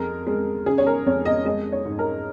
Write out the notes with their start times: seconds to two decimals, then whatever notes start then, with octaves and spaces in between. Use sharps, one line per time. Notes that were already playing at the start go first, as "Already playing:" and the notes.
Already playing: F2 G#3 A#4
0.27 G#3
0.66 C#3 G#4
0.78 C#5
0.86 A#4
1.06 F2 C#5
1.25 D#5
1.45 G#3 D#5
1.72 C#5
1.85 G#2
1.99 A#4